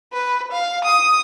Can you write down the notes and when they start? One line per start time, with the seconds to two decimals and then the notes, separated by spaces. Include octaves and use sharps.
0.13 B4
0.51 F5
0.84 D#6